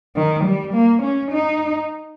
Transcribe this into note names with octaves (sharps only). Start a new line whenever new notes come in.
D#3
G3
A#3
C#4
D#4